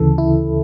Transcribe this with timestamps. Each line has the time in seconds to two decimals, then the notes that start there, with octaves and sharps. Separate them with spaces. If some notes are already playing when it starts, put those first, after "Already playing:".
Already playing: D2 C#3 E3 A4
0.18 E4